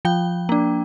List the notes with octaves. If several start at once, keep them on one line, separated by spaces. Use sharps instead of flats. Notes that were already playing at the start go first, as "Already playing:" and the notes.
F3 G5
A#3 D4